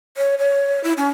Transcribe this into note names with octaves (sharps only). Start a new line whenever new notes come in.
C#5
C#5
E4
C#4